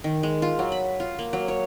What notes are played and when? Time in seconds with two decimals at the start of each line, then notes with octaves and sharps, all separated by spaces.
0.04 D#3
0.23 G#3
0.42 F4
0.59 F#3
0.72 B5
1.00 F4
1.19 A#3
1.33 F#3
1.48 C#5